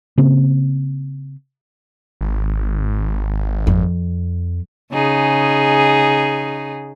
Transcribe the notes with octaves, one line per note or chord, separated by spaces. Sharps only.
C#3 A#3 C4
G#1
F2
C#3 D#4 G#4